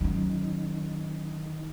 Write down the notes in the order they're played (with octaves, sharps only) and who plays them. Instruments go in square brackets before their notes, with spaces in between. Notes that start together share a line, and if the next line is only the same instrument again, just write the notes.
[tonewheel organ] D#3 D#4 [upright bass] F#3 C#4